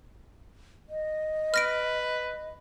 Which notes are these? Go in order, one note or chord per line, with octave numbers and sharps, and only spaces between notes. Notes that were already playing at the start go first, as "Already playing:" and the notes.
D#5
B4 F6 A#6 D7